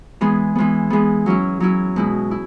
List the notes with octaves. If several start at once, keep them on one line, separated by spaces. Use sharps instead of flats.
E3 G#3 B3 G#4
E3 G#3 B3
E3 G#3 B3
F#3 C#4 E4
F#3 C#4 E4
B2 G#3 E4
E4